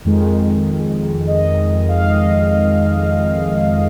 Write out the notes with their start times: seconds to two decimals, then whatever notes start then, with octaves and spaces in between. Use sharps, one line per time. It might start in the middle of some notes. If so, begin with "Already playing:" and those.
0.04 F2 D#3 G#3
1.27 D#5
1.88 F5
2.09 D#5